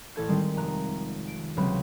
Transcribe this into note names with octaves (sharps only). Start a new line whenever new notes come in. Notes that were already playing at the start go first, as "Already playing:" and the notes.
A1 A4 G#6
D#3 G3 G#3 C4
F1 A#5 F#6
D7
C#2 C3 F#3 C4 B4 B5